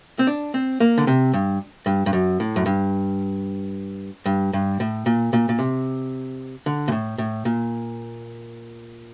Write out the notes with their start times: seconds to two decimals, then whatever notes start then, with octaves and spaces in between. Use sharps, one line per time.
0.19 C4
0.27 D4
0.54 C4
0.80 A#3
0.98 D3
1.07 C3
1.34 G2
1.86 G2
2.06 G2
2.13 F#2
2.40 A2
2.56 F#2
2.66 G2
4.26 G2
4.53 G2
4.80 A2
5.06 A#2
5.33 A#2
5.49 A#2
5.59 C3
6.66 D3
6.88 A#2
6.92 A2
7.18 A2
7.45 A#2